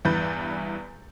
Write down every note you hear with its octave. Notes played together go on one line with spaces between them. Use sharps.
E2 G2 E3 B4 G6 A6